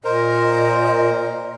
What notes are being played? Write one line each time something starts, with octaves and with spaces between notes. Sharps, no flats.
A#2 A#4 C5 D#5